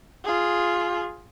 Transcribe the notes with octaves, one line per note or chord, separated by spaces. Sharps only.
F4 G#4